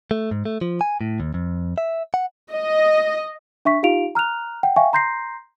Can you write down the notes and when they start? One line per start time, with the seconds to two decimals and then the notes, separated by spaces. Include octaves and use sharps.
0.11 A3
0.31 G#2
0.45 A3
0.61 F3
0.81 G#5
1.01 A2
1.20 D#2
1.34 F2
1.78 E5
2.14 F#5
2.52 D#5
3.65 D4 E5 C#6 B6
3.83 D#4 F4 G4 F5 D7 F7
4.15 A#5 F6 F#6 F7
4.63 F#5 G5
4.76 E5 F5 G5 G#5 C#6
4.93 A#5 C6 G6 A#6 C7